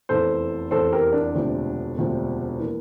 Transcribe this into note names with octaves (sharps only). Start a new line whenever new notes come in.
F1 E2 E3 A4 C5
F1 E2 E3 A4 C5
G4 A#4
D4
E1 D2 C3 F3
E1 D2 C3 F3
E3 A#3